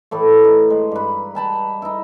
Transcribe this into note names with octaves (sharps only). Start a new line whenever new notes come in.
A2 E3 A3
D#4
G#3
G2 B4
G5 A5 B5
D#4 E4